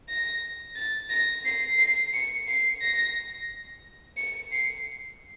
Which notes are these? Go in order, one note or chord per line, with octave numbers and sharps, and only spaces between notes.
A#6
A6
A#6
C7
C7
C#7
C7
A#6
C#7
C7